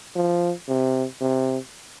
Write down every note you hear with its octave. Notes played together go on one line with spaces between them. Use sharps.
F3
C3
C3